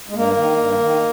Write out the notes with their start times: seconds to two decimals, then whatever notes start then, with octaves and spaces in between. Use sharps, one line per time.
0.09 G#3
0.15 G2 A#3
0.36 D#3
0.57 G2
0.79 D#3